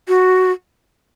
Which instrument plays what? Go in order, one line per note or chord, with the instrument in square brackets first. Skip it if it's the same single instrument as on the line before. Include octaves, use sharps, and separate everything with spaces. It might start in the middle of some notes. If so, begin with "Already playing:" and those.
[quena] F#4